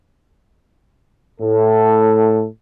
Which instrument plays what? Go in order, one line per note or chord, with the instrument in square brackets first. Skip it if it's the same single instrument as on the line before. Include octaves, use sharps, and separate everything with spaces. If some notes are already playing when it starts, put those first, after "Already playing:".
[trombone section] A2 A4